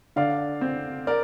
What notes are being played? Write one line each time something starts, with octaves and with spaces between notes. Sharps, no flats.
D3 D5 F5
C4
A#4 D5